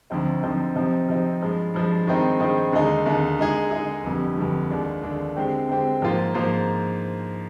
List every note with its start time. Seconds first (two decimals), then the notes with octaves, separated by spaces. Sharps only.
0.10 D2 D3 F3 C4 D#4
0.43 D2 D3 F3 C4 D#4
0.76 C3 F3 C4 D#4
1.09 C3 F3 C4 D#4
1.41 G2 F3 G#3
1.74 G2 F3 G#3
2.07 G2 D#3 G#3 C4 D#4
2.40 G2 D#3 G#3 C4 D#4
2.73 D#2 D3 G#3 D#4
3.06 D#2 D3 G#3 D#4
3.39 D3 G#3 D#4 G#4
3.71 D3 G#3 D#4 G#4
4.04 G1 F2 D3 G3
4.37 G1 F2 D3 G3
4.70 D#2 D3 G#3 D4
5.03 D#2 D3 G#3 D4
5.37 D3 G#3 C4 G4
5.69 D3 G#3 C4 G4
6.02 G#2 F3 A#3 F4 C5
6.34 G#2 F3 A#3 F4 C5